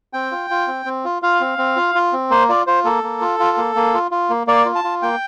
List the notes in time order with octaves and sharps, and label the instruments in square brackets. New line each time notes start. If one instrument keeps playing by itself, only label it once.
[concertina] C4 G5
F4
F4
C4
C4
F4
F4 F5
C4
C4
F4
F4
C4
A#3 C5
F4 D5
F4 C5
A#3 A4
A#3
F4
F4
A#3
A#3
F4
F4
A#3
A#3 D5
F4
A5
F4
A#3 G5